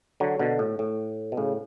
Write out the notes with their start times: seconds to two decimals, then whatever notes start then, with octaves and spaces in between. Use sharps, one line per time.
0.20 D3 F#3
0.39 B2 D3
0.59 A2
0.79 A2
1.32 B2
1.37 A2 C#3